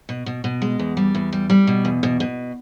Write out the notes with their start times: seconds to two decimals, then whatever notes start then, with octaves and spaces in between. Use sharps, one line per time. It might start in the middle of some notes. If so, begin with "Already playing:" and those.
0.09 B2
0.26 B2
0.44 B2
0.62 G#3
0.80 E2
0.97 G3
1.15 E2
1.33 G3
1.50 G3
1.67 B2
1.85 E2
2.03 B2
2.20 B2